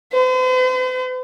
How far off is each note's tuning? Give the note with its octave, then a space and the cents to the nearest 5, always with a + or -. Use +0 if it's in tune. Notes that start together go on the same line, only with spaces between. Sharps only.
C5 -45